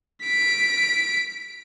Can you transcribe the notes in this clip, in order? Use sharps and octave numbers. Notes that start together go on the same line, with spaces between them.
B6 D7